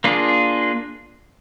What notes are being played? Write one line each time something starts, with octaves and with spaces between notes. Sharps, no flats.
A#3 D4 F4 G#4